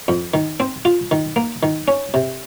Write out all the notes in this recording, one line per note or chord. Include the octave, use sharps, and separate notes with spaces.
F2
D#3
C4
F4
D#3
A#3
D#3
C#4
C3